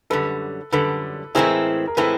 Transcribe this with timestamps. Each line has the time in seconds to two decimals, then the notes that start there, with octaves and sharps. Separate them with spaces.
0.10 F#2 D3 G3 A4 B4
0.72 F#2 D3 G3 A4 B4
1.35 A2 E3 G#3 C4 E4 G#4 A#4
1.87 A#4
1.97 A2 E3 G#3 C4 E4 A4 B4